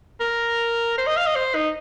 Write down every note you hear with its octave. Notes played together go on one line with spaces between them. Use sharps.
A#4
C5
D#5
F5
D#5
C5
D#4